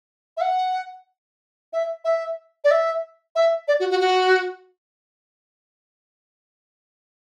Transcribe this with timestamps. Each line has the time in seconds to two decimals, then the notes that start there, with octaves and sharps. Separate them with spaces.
0.37 E5
0.41 F#5
1.73 E5
2.05 E5
2.64 D5
2.71 E5
3.35 E5
3.68 D5
3.80 F#4
3.90 F#4
4.00 F#4